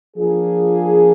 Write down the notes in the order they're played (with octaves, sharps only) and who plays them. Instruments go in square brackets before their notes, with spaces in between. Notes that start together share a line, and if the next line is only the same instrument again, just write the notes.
[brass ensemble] F3 A#3 D4 F4 G#4